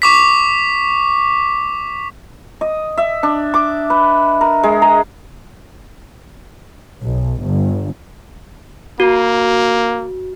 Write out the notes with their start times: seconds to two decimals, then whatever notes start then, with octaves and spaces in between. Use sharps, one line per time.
0.02 C#6 D6 B6
2.61 D#5
2.98 E5
3.23 D4
3.54 D6
3.90 B4
4.41 A#4
4.63 G#3
4.82 A#5
7.02 B1
7.41 G1
9.00 A#3 F#4